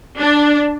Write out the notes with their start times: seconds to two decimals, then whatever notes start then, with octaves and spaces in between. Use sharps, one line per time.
0.18 D4